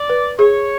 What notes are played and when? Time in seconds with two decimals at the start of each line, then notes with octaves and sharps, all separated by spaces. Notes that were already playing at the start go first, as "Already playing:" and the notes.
Already playing: D5
0.09 B4
0.39 G#4 C#5